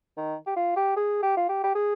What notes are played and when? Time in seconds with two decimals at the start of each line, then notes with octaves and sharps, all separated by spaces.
0.17 D#3
0.46 G4
0.56 F4
0.76 G4
0.96 G#4
1.22 G4
1.37 F4
1.49 G4
1.63 G4
1.75 G#4